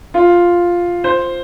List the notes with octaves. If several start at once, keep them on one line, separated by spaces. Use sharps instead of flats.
F4
C5